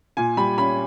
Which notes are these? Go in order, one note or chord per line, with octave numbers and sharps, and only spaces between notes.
A#2 G#5
G3 B5
C#4 B5